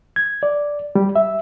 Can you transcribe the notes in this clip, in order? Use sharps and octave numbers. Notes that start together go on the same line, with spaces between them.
G#6
D5
G3
E5